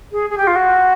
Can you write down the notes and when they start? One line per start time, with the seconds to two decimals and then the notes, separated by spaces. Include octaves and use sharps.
0.11 G#4
0.29 G#4
0.37 G4
0.46 F4
0.55 F#4